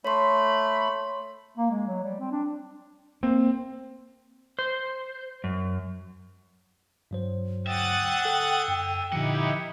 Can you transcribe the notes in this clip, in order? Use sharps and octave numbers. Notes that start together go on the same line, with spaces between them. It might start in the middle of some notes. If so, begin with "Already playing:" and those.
A3 C#5 B5 C6
A#3
G#3
F#3
G3
C4
D4
A#3 C4
C5
F#2
G2 F#3 C5
D5 E5 F#5 G5 D#6 A6
A4
F#2
A#2 D3 F3 D#4 E4 G4 A#4 F#5